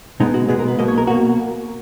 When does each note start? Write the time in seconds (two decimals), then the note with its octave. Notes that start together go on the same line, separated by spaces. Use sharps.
0.20 B2 G#3 B3 D#4
0.34 F#4
0.48 B2 G#3 B3 G#4
0.59 A#4
0.68 B4
0.79 B1 B2 A#3 D#5
0.88 C#5
0.98 A#4
1.07 B2 A#3 F#4